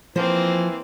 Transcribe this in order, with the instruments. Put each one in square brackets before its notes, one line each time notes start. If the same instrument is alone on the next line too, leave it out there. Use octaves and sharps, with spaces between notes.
[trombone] E3 [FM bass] F3 [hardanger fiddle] A#3 C4 [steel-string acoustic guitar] C5